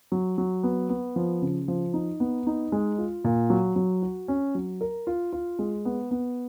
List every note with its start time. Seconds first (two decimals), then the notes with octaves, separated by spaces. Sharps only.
0.12 F#3
0.38 F#3
0.63 B3
0.90 B3
1.16 F3
1.42 C#3
1.68 F3
1.94 D#4
2.20 B3
2.47 D#4
2.72 G#3
2.98 F4
3.24 A#2
3.50 F#3
3.76 F#3
4.02 F#4
4.28 C#4
4.55 F#3
4.81 A#4
5.07 F4
5.33 F4
5.59 G#3
5.85 B3
6.11 B3